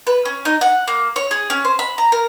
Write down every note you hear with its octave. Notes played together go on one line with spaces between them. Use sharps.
B4
C#4
D#4
F#5
A#3
C#5
G#4
C#4
C5
B5
A#5
A#4